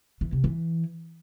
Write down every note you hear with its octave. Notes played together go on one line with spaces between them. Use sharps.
E3
C3
E3